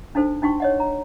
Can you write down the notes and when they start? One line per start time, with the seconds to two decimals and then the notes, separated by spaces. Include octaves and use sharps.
0.15 D4 D#4 F#4 A4 C5
0.42 D4 D#4 F#4 G5 C6 C#6
0.60 C#5 D#5 F#5
0.80 A#5